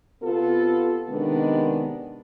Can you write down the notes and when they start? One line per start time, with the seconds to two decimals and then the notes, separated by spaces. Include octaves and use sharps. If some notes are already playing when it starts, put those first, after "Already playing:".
0.22 C3 B3 F4 A4
1.08 C3 D#3 G#3 B3 D4